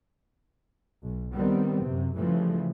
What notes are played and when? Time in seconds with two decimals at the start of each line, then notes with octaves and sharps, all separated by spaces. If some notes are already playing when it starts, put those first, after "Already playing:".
1.02 B1
1.33 D#3 G3 B3 C4
1.83 F#2 C3
2.17 C#3 E3 F3 G3 A3